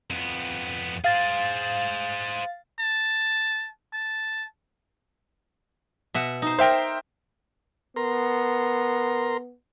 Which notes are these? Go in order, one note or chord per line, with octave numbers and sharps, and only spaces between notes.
F2 B3
G#4 C5 F5 A6
A5
A5
B2 E5 F#5
D#4 C5
A#4 C5 E5 F5 G5
B3 A#4 A#5 C6